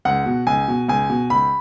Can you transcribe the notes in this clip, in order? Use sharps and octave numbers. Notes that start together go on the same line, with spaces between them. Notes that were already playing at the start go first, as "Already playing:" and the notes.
C#2 F#5
B2
C#2 G#5
B2
C#2 G#5
B2
C#2 B5